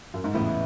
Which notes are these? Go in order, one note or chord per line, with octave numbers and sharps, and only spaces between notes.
F#2
G#2
E2 A2 C#3 E3 B3 E4